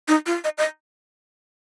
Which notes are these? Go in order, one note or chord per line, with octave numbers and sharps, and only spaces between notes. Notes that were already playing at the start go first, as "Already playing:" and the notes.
D#4
F4
D#5
D#5